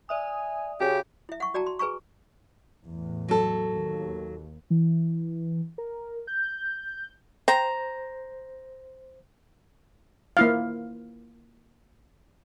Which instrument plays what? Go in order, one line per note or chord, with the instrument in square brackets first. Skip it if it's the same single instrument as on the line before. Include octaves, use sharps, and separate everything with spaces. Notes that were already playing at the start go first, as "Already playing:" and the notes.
[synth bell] D5 E5 D#6 [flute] G#5
[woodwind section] C#3 [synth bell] F#4 [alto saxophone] G4
[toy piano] E4 E5
F#5 C#6
F#4 D5 G5 A5 A#5
C6
G#4 B4 G#5 A#5 C#6
[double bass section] E2 A2
[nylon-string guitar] F#3 A4
[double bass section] D#2
[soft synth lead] E3
A#4
G6
[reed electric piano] C5 [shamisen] G5 [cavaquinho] A#5
[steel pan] A#3 E4 F5